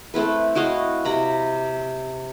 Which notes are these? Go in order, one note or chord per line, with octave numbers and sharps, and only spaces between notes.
A3 C4 E4 B4
E4 F#4 D#5 F5
C3 A#5 B5